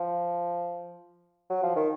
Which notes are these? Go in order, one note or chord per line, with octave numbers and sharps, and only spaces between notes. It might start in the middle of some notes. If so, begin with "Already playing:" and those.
Already playing: F3
F#3
F3
D#3